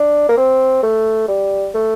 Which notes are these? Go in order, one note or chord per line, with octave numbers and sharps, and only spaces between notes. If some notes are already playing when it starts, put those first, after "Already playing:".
Already playing: D4
A#3
C4
A3
G3
A3